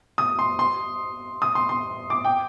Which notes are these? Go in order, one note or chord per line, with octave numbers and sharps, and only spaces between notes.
D#6
C6
C6
D#6
C6
C6
D6
G5